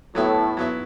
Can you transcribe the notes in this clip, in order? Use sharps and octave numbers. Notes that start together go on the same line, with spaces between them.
A2 F#3 B3 E4
F#3 B3 E4